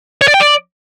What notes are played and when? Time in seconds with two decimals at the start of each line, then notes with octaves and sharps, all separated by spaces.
0.21 C#5
0.28 D5
0.34 G5
0.40 D5